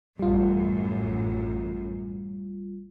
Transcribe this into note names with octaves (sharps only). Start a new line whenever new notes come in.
A1 F#2 G3 F4